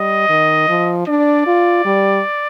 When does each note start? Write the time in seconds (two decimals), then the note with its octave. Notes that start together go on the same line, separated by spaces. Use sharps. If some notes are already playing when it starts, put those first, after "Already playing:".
Already playing: G3 D#5
0.29 D#3
0.69 F3
1.08 D4 D5
1.47 F4
1.86 G3